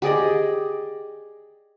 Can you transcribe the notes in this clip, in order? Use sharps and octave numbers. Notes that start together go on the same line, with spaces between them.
G4 G#4 D5 D#5